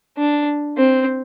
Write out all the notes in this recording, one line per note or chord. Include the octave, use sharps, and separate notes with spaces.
D4
C4